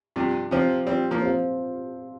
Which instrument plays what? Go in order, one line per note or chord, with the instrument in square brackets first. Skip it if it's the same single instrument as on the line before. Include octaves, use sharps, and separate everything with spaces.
[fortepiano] G2 C3 [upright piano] F3
[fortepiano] C3 F3 [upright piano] C4 F4 C5
[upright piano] F3 [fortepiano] G3 C4
[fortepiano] F3 A#3
[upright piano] C4 F4 C5